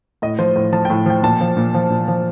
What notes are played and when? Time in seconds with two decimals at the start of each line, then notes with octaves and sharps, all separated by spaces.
0.22 A2 D#5
0.39 F3 C5
0.56 A2 C5
0.72 F3 A5
0.85 A2 G5
1.06 F3 G5
1.23 A#2 A5
1.41 F3
1.57 A#2
1.74 F3
1.90 A#2
2.08 F3